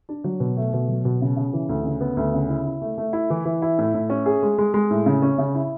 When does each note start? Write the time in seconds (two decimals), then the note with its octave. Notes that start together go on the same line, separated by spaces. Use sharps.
0.09 D4
0.24 F#3
0.40 B2
0.57 A3
0.73 B2
0.88 F#3
1.05 B2
1.22 C#3
1.36 C#3
1.53 E3
1.69 D2
1.85 C#3
2.01 B3
2.17 D2
2.34 C#3
2.49 E4
2.66 E4
2.82 A3
2.98 A3
3.13 E4
3.30 E3
3.45 E3
3.62 E4
3.78 A2
3.94 A2
4.10 C#4
4.26 G#4
4.43 G#3
4.58 G#3
4.74 G#3
4.90 A2
5.06 C#3
5.22 C#4
5.38 C#3
5.55 E4